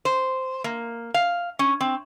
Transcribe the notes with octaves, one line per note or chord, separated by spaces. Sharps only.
C5
A#3
F5
C#4
C4